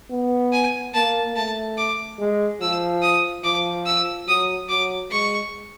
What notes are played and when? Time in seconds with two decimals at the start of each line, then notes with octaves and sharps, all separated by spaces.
0.11 B3
0.53 G#5
0.94 A#3 A5
1.36 A3 A5
1.78 D6
2.19 G#3
2.61 F3 E6
3.03 D#6
3.44 F3 D6
3.86 E6
4.28 F#3 D#6
4.69 F#3 D6
5.11 G#3 C#6